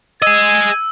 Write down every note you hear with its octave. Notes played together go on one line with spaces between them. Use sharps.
G#4 D#5 E6 G#6